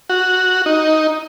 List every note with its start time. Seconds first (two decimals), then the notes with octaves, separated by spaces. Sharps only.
0.10 F#4
0.66 D#4